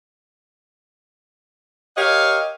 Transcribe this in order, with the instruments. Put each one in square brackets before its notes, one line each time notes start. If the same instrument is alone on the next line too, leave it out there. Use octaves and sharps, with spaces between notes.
[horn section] G4 A#4 C#5 D#5 F5